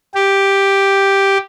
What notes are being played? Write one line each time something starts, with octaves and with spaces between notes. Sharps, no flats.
G4